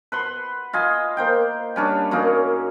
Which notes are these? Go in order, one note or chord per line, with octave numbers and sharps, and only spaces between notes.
B4 F#5 C6
F4 D#5 G#5
A#3 C5 G5
G3 C#4 D4
F#2 A#3 C#4 D#4